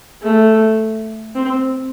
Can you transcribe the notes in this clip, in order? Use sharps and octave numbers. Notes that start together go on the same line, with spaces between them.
A3
C4